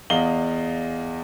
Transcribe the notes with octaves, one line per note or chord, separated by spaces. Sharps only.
E2 D#5 F5 F#7 G7